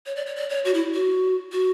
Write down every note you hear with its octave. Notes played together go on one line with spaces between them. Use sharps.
C#5
D5
C#5
D5
C#5
F#4
E4
F#4
F#4